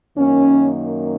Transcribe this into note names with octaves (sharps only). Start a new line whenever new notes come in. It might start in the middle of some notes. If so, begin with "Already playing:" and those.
F#2 D#3 A#3 C#4